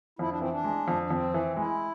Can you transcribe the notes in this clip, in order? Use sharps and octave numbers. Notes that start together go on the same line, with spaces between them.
F2 E4
D4
E3 C4
D4
G#3
F2
D4
F2 C4
E3
G#3 E4